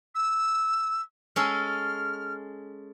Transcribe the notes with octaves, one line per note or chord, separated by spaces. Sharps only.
E6
G#3 C#4 A4 F6